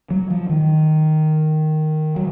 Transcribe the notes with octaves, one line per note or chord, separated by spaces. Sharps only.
F#3
F3
D#3
F#3